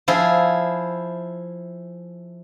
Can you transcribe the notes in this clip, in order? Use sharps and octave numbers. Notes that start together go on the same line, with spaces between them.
F3 E4 G#4